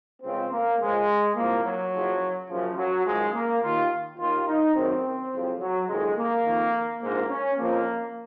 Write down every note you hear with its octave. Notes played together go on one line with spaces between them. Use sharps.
C#2 C#3 F3 C4
A#3
C#2 C#3 F3 G#3
C2 A#2 F3 A#3
F#3
F#1 F#2 F3
F#1 F#2 C#3 F3
F#3
G#1 F#2 C#3 F3 G#3
A#3
D#2 D#3 F4
D#2 D#3 F4
D#4
F#1 F#2 D#3 C4
F#1 F2 C#3 F3
F#3
F#1 F2 D#3 G#3
A#3
F2 D#3
A#1 G#2 F3 A#3
C#4
F2 C#3 F3 A#3